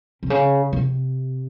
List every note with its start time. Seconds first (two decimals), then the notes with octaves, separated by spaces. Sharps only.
0.23 C3
0.30 C#3
0.73 C3